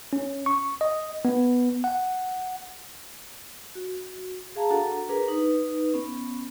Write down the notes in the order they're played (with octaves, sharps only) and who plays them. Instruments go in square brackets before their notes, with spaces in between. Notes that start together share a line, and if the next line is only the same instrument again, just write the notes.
[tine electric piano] C#4
C#6
D#5
B3
F#5
[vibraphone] F#4
G#4 F5 A5 A#5
D4 F#4 A4 F#5 A#5
D4 G#4 A#4 B4 A#5
D#4 B4
B3 C#4